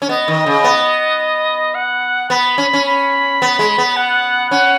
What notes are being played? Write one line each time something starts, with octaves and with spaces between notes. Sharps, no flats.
C#4
B3 D#5
D#3
C#3
B3
F#5
B3 B5
C#4
C#4
B5
B3
G#3
B3
F#5
C#4 F#5